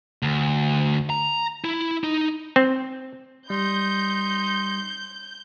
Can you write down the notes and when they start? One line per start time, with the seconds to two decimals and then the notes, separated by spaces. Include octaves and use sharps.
0.22 D2
1.10 A#5
1.64 E4
2.04 D#4
2.56 C4
3.50 G3 D#4 C6 G6